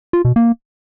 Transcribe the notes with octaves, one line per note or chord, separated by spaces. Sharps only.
F4
B2
A#3